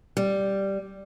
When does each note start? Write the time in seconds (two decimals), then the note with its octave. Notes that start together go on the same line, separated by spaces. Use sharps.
0.17 G3